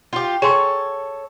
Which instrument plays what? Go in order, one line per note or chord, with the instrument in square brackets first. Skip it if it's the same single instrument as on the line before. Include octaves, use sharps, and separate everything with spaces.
[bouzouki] F4 G4
[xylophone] G#4 G#5 C6 [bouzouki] A4 C#5